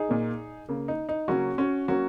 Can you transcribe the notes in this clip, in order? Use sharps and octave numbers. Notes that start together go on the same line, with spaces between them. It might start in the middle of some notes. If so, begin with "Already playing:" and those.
Already playing: D#4 G#4
A#2 A#3
C#3 A#3
D#4
D#4
C#3 F#3 A#3 C#4 F#4
C#4 F#4
F#3 A#3 C#4 F#4